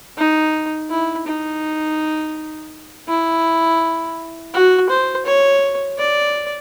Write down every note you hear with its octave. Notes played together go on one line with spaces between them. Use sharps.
D#4
E4
D#4
E4
F#4
C5
C#5
D5